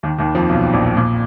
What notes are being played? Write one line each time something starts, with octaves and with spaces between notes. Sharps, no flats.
D#2 D#3
D#2 D#3
F2 F3
B1 B2
A#1 A#2
A#2